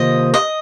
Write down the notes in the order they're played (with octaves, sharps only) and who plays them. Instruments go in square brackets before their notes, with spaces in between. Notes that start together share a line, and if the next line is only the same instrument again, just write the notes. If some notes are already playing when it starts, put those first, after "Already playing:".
Already playing: [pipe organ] C3 D#3 A#3 F4 C5 [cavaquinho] D#5
[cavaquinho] D#5